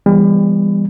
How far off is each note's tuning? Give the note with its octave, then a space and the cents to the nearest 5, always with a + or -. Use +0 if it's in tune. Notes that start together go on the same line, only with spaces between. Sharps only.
E3 +40 G3 +40 B3 +0